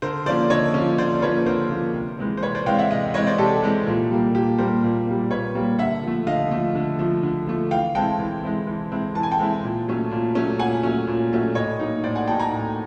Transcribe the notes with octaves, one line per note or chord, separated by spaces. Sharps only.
D3 A#4 C5
F3 A#3 C#4 C5 D5
D3 C#5 D#5
F3 A#3 C#4
D3 C5 D5
F3 A#3 C#4 B4 C#5
D3 A#4 C5
F3 A#3 C#4
C3
E3 G#3 C4
C5
C3 B4 C#5
C5 D5
E3 G#3 C4 F5 G5
E5 F#5
C3 D#5 F5
E3 G#3 C4 C#5 D#5
C5 D5
C3 G4 A4
E3 G#3 C4
A#2
G3 A#3
A#2 G4
G3 A#3 A#4 C5
A#2
G3 A#3
A#2 B4 C#5
G3 A#3
D3 E5 F#5
F3 A3
D3 D#5 F5
F3 A3
D3
F3 A3
D3
F3 A3
E3 F5 G5
G#3 C4 E4 G5 A5
E3
G#3 C4 E4
E3
G#3 C4 E4
E3 A5
G#5
G5 A5
G#3 C4 E4
A#2
F#3 A3 C#4
A#2
F#3 A3 C#4
A#2 F#5 G#5
F#3 A3 C#4
A#2
F#3 A3 C#4
A2 C#5 D#5
F#3 A#3 D#4
A2 C5 D5
F#5 G#5
F#3 A#3 D#4 G5 A5
G#5 A#5
A2